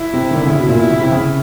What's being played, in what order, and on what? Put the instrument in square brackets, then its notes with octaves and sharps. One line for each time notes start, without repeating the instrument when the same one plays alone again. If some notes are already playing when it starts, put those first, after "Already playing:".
Already playing: [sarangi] E4
[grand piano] C3
D#3
D3
C#3
B2
A#2
[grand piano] B2 [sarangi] E4
[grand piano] C#3
C3
C#3